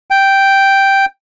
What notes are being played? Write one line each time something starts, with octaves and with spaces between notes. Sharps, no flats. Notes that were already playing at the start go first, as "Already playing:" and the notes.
G5